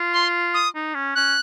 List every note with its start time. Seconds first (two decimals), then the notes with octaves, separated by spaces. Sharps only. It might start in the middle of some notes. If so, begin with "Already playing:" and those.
Already playing: F4
0.13 C6
0.54 D#6
0.75 D#4
0.95 C#4
1.15 C#4 F#6